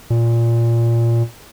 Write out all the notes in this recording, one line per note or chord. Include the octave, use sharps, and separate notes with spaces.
A#2